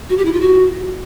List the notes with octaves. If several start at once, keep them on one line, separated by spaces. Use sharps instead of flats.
F#4
G4
E4
F4
F#4